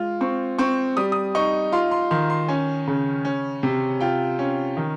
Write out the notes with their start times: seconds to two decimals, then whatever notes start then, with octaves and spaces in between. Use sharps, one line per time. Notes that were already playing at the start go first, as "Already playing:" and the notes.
Already playing: G#3 F4
0.21 C4 C#6
0.59 C4 C#6
0.97 G3 D#6
1.12 D#6
1.35 D#4 C#6
1.72 F4 C6
1.91 C6
2.11 D#3 C6
2.30 C6
2.48 C#4 G#5
2.87 C#3
3.25 C#4
3.63 C3
4.01 F4 G5
4.39 C#4
4.77 D#3